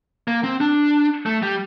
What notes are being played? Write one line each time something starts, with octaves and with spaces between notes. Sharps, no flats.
A#3
C4
D4
A3
G3